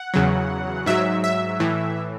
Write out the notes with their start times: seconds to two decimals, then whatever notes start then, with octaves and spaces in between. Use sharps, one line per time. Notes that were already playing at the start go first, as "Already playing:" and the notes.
Already playing: F#5
0.14 E2 C#3 F#3
0.86 G#2 F#3 E5
1.24 E5
1.60 A2 E3